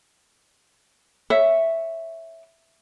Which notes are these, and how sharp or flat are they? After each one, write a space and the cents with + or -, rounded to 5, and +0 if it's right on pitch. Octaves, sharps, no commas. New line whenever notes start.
C#5 +0 E5 +0